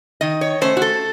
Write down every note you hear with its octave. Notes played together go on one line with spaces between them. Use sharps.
D#3 D#5
C#5
A3 C#4 C5
F#4
A4